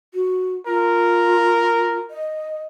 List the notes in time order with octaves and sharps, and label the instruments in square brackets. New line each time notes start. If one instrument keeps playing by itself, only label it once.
[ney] F#4
[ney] F4 [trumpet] A#4
[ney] D#5